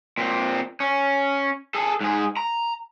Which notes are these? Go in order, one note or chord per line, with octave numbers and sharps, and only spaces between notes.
A#2 C4
C#4
G#4 A4
G#2 G#4
A#5